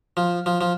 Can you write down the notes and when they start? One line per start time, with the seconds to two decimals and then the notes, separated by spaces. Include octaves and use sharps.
0.17 F3
0.46 F3
0.61 F3